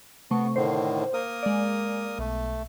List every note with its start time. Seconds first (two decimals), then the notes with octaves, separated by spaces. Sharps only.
0.31 C3 A3 B3 C#6
0.56 A2 D3 D#3 C5
1.14 A#3 A#4 D#6
1.43 G#3 D5
2.19 B1 A3